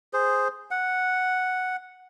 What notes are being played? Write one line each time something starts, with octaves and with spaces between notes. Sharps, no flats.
G#4 C5
F#5